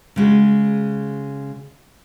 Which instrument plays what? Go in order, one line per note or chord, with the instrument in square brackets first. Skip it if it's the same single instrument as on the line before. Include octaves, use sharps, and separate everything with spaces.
[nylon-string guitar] C#3 G#3 F#4